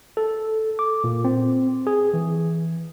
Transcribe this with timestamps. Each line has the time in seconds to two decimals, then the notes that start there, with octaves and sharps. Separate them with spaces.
0.17 A4
0.79 D6
1.04 A#2
1.24 C4
1.87 G#4
2.14 E3